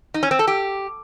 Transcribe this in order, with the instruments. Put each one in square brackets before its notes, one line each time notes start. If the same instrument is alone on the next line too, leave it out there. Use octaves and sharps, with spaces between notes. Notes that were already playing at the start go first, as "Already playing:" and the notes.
[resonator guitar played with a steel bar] D#4
C#4
C4
A4
G4